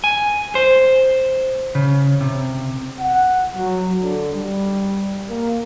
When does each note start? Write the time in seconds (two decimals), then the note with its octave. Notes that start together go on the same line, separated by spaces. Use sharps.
0.04 G#5
0.55 C5
1.75 C#3
2.21 C3
3.00 F#5
3.55 F#3
4.01 D3
4.33 G3
5.28 A#3